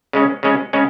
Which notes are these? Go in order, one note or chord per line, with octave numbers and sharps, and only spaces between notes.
C#3 G#3 C#4
C#3 G#3 C#4
C#3 G#3 C#4